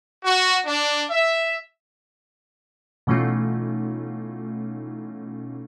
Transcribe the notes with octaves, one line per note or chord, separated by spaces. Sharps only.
F#4
D4
E5
B2 E3 A3 C#4 D#4 F4